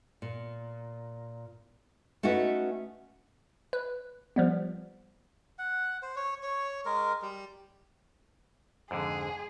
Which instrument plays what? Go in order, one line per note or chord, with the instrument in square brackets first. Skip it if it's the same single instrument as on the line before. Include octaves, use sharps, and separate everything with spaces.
[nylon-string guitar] A#2
A3 C#4 D#4 F#4 A4 B4
[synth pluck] B4
F3 G3 B3
[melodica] F#5
C5
C#5
C#5
G#3 A#4
G3
[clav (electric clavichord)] F2 G#2 D3 [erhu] G#4